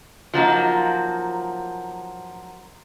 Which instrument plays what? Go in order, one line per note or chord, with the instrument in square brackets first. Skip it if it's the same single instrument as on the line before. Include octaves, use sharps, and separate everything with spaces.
[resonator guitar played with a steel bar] F3 F#3 A#3 D#4